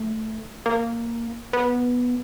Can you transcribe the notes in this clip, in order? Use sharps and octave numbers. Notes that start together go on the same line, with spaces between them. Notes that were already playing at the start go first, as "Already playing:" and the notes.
Already playing: A3
A#3
B3